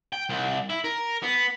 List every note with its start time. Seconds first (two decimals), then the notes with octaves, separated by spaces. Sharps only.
0.13 G5
0.29 C2
0.70 E4
0.84 A#4
1.23 B3